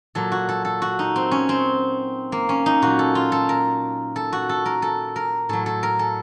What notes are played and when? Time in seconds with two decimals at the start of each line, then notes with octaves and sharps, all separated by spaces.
0.15 A#2 F#3 A4
0.32 F#4
0.49 A4
0.65 A4
0.82 F#4
0.99 D#4
1.16 C4
1.31 C#4
1.49 C4
2.32 A#3
2.49 C#4
2.66 D#4
2.82 A#2 F#3 F#4
2.99 A4
3.15 F4
3.32 A4
3.49 A#4
4.16 A4
4.33 F#4
4.49 A4
4.66 A#4
4.82 A4
5.16 A#4
5.49 A2 F#3 A4
5.66 A4
5.83 A#4
5.99 A4